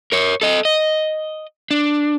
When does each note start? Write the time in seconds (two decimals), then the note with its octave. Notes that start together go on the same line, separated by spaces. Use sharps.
0.12 A#4 C#5
0.42 A4 D#5
0.65 D#5
1.71 D4